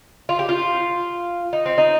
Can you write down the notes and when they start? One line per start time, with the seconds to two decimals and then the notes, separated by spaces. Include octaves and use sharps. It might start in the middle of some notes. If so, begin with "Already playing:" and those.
0.29 F4
0.39 G4
0.49 F4
1.53 D#4
1.66 C4
1.78 D#4